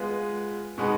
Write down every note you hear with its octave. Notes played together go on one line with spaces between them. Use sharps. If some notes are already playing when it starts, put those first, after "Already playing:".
Already playing: G#3 B3 F4 B4
B2 G#3 B3 D#4